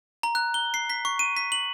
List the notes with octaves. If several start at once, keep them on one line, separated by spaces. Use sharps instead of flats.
A#5
F#6
G7
C7
B6
C#6
D#7
B6
F#7